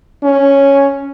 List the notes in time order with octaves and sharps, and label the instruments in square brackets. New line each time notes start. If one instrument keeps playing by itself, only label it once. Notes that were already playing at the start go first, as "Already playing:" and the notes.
[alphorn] C#4